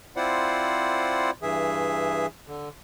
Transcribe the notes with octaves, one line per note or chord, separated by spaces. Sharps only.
C4 E4 F4 C5 D5 F#5
G2 E3 G#4 E5
D3